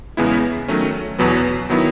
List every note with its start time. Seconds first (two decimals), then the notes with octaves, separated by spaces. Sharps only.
0.17 E2 C#3 G#3 B3 E4
0.68 D#3 F#3 A3 C#4
1.18 E2 B2 F#3 B3
1.69 D#3 F#3 B3 E4